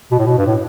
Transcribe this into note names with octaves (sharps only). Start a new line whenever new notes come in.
B2
A2
B2
G2
A2